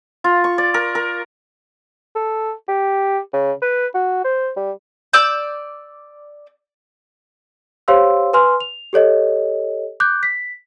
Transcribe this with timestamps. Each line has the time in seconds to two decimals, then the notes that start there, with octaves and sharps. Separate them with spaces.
0.24 F4
0.44 C#6
0.58 D5
0.74 A#4
0.95 A#4
2.15 A4
2.68 G4
3.33 C#3
3.62 B4
3.94 F#4
4.24 C5
4.56 G3
5.13 D5 D6 E6 G6
7.88 G4 C5 C#5 F5 C6 E6
8.33 B4 G#5 C6 F6
8.60 F7
8.93 G4 A4 C#5 D#5
10.00 D6 F#6 G6
10.23 B6